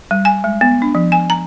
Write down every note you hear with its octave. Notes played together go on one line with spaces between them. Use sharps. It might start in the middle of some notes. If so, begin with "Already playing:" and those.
G3
G#5
G#3
B3
D4
F3
G#5
A#5